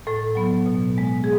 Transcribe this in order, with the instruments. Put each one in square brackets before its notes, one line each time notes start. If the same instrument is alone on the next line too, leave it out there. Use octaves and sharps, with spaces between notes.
[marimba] A2 A4
F#3 B3
B2
G#3 B3
G#4